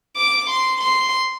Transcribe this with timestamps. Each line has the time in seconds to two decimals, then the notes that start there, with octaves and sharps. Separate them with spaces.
0.17 D6
0.50 C6
0.81 C6